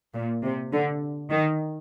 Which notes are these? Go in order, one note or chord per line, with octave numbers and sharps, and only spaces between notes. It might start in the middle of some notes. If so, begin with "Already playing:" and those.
A#2
C3
D3
D#3